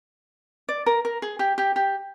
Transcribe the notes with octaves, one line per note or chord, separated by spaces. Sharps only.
D5
A#4
A#4
G#4
G4
G4
G4